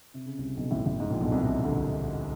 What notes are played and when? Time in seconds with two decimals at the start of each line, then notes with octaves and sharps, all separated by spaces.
0.14 C3
0.26 C#3
0.38 C2 C3
0.57 B1 B2
0.71 A1 A2
0.85 A1 A2
1.00 G#2
1.10 A#1 A#2
1.21 B1 B2
1.31 C2 C3
1.42 C2 C3
1.63 D2 D3